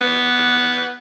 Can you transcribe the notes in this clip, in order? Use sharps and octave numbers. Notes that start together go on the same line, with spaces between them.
B3